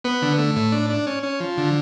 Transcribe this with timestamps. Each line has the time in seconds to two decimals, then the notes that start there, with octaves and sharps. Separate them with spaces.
0.04 B3
0.22 D3
0.38 A3
0.56 A2
0.72 D4
0.90 D4
1.07 C#4
1.23 C#4
1.40 F3
1.58 D3